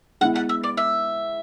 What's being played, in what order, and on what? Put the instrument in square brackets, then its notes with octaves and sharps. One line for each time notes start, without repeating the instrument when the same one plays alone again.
[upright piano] G#3 B3 E4 [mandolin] F#5
[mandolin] F#5
E5
D5
E5